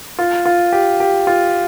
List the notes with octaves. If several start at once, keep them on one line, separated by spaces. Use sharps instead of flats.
F4
F4
G4
G4
F4